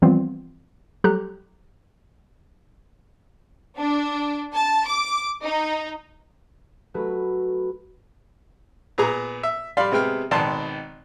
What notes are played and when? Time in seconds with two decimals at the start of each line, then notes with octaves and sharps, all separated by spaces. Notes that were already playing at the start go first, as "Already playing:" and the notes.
0.02 E3 F3 G3 B3 C4 F4
1.04 F#3 G3 G4 A4 A#5 F#6
3.78 D4
4.53 A5
4.87 D6
5.44 D#4
6.94 F#3 A3 F#4 B4
8.98 A#2 B3 G#4 A#5
9.43 E5
9.77 G3 D5 F5 B5 C6
9.92 C3 G#3 B3 G5 F6
10.31 G#1 B2 D#3 D5 A5 C6